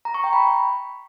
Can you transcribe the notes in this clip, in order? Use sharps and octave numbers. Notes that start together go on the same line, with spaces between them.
A#5
C#6
G5
B5